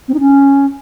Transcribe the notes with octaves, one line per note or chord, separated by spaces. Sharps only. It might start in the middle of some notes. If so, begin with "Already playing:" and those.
C4
D#4
C#4